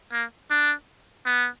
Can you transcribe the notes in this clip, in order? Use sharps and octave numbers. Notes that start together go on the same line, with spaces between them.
A#3
D4
B3